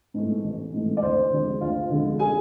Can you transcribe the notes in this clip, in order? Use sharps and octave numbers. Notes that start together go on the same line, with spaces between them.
G#2 E3 A3
A1
G#2 E3 A3
D5
D2 C5
D3 F3 G#3
D2 F4 F5
D3 F3 G#3
G#4 G#5